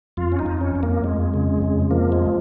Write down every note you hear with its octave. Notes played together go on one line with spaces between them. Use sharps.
F2 F4
C#4
D#4
F2
C#4
F2
A#3
F2 G#3
C#3
F2
F3 A#3
G#3